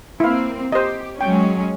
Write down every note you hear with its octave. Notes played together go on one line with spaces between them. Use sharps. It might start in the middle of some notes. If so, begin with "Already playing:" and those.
A#3 C4 E4 F5
G4 C5 D#5
F#3 G#3 C#4 G5